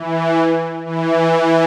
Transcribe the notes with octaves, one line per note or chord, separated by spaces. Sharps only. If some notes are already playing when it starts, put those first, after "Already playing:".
Already playing: E3
E3